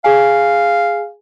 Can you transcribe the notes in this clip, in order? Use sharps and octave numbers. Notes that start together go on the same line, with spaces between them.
G#4 F5 G#5